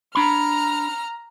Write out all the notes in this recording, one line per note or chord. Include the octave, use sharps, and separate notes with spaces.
D4 A#5 B5 F6